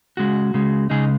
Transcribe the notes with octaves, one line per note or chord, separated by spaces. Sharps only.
C#2 C#3 G#3 F#4
C#2 C#3 G#3
C#2 C#3 G#3 D#4 G#4